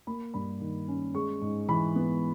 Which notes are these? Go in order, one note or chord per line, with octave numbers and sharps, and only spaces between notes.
A#3 B5
G2 B5
D#3
C#4
G#3 C#6
G#2
E3 B5
B3